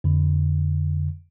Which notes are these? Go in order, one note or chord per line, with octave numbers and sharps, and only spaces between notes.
F2 D3